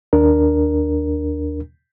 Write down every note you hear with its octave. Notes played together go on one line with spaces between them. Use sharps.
D#2 D4 A#4